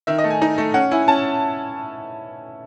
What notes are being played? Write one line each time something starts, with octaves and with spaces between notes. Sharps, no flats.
D#3 E5
D#5
A3
G#5
D#4
A3
C#4 F#5
E4 G#5
C#4 A5